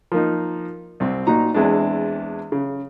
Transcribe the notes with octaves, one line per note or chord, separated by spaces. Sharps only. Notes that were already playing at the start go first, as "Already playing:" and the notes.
F3 A#3 D#4
C2 C4
A#2 D#4 F#4 A#5
E2 E3 G#3 C4 D4
C#3